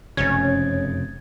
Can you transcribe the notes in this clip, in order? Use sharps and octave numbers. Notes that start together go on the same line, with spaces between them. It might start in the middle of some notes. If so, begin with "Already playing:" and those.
F1 F#2 C#3 C#4 G#6 A6